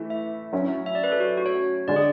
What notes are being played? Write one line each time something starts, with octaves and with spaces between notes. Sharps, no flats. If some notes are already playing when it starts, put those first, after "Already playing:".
Already playing: E3 A3 E4
E5
F#3 C#4 E4
E5
D5
B4
A4
F#4
F#4
C#5
D3 G#3 D4 D5
G#4